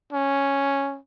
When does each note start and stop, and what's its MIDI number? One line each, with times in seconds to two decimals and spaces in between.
0.13 0.99 61